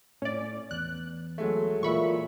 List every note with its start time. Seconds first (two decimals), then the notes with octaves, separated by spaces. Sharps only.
0.22 A2 C#4 D5
0.71 E2 F#6
1.38 F#3 G#3 A3
1.83 A#2 E3 E5 B5 C#6